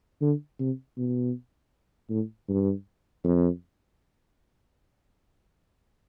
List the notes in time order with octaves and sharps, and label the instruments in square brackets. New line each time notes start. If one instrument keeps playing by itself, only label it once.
[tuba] D3
C3
B2
A2
G2
F2